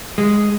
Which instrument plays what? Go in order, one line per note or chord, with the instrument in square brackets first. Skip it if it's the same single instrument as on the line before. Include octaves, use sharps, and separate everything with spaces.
[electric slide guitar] G#3